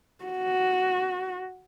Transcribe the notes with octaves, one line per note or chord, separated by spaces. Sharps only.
F#4